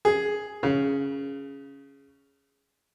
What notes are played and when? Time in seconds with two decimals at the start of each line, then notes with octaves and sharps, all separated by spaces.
0.05 G#4
0.63 C#3